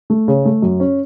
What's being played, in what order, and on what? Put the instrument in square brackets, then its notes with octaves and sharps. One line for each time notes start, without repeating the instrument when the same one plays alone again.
[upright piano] A3
C#3
A3
F#2
C#4